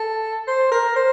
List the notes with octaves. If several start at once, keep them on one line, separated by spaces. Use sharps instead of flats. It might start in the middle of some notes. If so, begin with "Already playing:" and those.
Already playing: A4
C5
A#4
C5